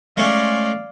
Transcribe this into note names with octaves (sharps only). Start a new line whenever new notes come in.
G#3 A3 C#4 D5 F5